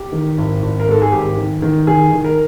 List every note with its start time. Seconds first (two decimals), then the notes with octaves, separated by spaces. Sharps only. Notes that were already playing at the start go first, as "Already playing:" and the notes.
Already playing: G4
0.12 D#3
0.38 G#1
0.62 G#1
0.80 A#4
0.88 G#2 A4
1.02 G#4
1.12 G#1 G4
1.37 D#3
1.62 D#3
1.87 D#3 G#4
2.12 D#3
2.25 A#4